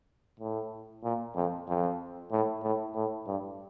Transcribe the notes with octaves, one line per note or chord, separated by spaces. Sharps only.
A2
A#2
F2
F2
A2
A2
A2
G2